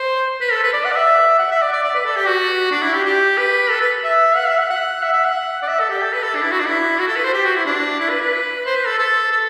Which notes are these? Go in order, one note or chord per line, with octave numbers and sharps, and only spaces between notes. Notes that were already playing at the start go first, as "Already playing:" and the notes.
Already playing: C5
B4
A4
B4
D5
F#5
D5
E5
F#5
E5
D5
D5
D5
B4
A4
G4
F#4
D4
E4
G4
G4
B4
A4
B4
E5
F#5
E5
F#5
F#5
E5
E5
F#5
D5
E5
A4
G4
A4
B4
A4
D4
E4
F#4
D4
E4
F#4
A4
B4
C5
G4
F#4
E4
D4
E4
B4
B4
C5
B4
A4
A4
A4